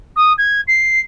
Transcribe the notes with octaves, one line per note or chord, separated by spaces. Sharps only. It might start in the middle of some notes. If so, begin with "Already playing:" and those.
D#6
G#6
C7